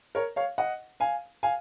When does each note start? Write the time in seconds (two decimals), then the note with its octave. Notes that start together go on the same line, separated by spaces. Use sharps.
0.15 A#4 C#5
0.36 C#5 F5
0.58 D#5 F#5
1.00 F5 G#5
1.43 F5 G#5